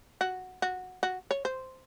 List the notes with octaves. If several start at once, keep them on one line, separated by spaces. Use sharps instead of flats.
F#4
F#4
F#4
C#5
C5